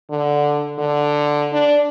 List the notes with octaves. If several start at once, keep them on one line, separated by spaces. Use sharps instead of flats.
D3
D3
D4